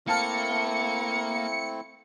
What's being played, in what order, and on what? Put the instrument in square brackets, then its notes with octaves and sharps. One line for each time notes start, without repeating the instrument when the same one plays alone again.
[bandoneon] A3 C4 E4 [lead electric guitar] A#3 [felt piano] F5 A5 F6 [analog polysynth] C#7